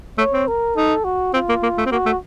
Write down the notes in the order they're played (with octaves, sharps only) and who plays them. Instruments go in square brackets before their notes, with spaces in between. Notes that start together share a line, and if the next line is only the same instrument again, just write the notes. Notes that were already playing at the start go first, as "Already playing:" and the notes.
[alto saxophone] A3 [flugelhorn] C#5
[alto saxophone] C4
[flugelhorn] A#4
[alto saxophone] D#4 [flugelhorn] A4
[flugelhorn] F#4
[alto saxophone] C4 [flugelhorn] F4
[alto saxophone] A#3
A#3
A3
C4
[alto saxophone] A#3 [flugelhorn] F#4
[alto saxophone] A3